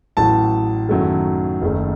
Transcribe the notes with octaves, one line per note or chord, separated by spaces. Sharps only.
A1 A2 F#3 A5
F#2 D#3 F#3 A3
F#1 F#2 D#3 A3